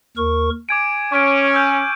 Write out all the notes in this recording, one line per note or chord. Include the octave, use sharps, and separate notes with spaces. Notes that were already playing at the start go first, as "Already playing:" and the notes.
D#2 A#4 C#6
G#5 D6 G#6 D7
C#4 C#6 F6 D7
E6 G6